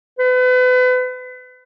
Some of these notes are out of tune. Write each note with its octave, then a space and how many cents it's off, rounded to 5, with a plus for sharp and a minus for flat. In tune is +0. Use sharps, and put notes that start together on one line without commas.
B4 +35